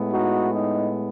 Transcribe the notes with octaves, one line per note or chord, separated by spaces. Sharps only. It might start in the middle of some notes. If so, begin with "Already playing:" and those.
Already playing: A2 G#3 B3
D#4 F#4
D#4